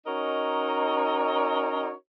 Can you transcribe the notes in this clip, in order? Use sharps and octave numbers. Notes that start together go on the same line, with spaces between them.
C#4 D#4 F#4 A#4 C#5 D#5